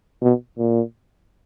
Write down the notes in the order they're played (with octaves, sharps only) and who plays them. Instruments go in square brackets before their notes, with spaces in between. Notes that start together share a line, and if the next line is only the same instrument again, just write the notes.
[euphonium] B2
A#2